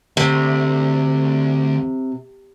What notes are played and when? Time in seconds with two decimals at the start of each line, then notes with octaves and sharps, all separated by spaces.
0.17 D2 C3